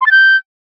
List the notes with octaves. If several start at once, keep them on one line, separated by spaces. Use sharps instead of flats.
C6
A6
G6